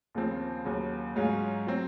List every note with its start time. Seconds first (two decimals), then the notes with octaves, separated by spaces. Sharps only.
0.15 D#2 C#3 F3 C4
0.65 D#2 C#3 F#3
1.16 G#2 F#3 C#4 F4 G#4
1.67 F#3 C4